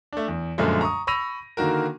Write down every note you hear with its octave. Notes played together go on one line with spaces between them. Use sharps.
A3 D4
E2
F#2 A#2 D3 F3 G#3 A3
A#5 C#6 D#6
B5 C#6 E6 A#6 D#7 F7
D3 D#3 A#3 F#4 A#4